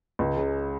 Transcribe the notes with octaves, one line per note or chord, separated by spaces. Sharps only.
C#2
C#3